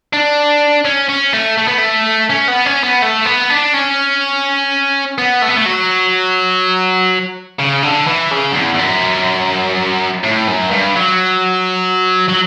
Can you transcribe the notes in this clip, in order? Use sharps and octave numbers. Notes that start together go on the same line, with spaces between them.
D4
C#4
C#4
A3
A3
B3
A3
C#4
B3
C#4
B3
A3
B3
D4
C#4
B3
A3
B3
A3
F#3
C#3
D3
E3
C#3
F#2
E2
E2
F#2
A2
F#2
G2
F#3
F#3